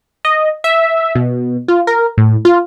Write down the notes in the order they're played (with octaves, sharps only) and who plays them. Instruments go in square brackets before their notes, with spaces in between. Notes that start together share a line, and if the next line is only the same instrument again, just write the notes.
[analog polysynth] D#5
E5
B2
F4
A#4
A2
F4